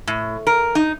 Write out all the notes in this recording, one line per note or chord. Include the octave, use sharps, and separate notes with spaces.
A2
A#4
D#4